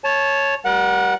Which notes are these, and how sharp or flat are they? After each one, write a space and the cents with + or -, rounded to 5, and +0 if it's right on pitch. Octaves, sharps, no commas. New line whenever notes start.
C#5 -5 A5 -20
G3 -15 A#4 +35 F#5 -10